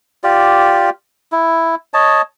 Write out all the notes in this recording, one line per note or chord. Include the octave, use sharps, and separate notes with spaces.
F4 G4 D5
E4
C#5 D#5 A5